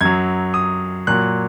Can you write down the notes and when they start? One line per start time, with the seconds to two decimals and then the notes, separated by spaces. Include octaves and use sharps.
0.01 F#2 F#3 G#6
0.54 D#6
1.07 A#2 F#3 F#6